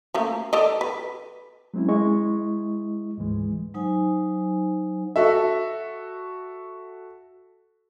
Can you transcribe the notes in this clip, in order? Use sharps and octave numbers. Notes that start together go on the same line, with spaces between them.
A3 A#3 C#4
A4 D5 D#5
B4
F#3 G#3 C4 C#4 E4
G#3 E4 D#5 C#6
D2 G#2 E3 G#3
F#3 D#4 C5 G#5
F#4 A4 E5